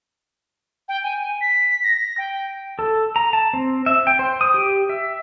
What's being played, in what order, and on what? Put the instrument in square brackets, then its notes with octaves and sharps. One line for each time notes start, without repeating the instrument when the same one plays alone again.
[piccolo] G5
G#5
B6
A#6
A#6
G5
[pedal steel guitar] A4
A#5
A5
C4
E5
G5
C5
D#6
G4
E5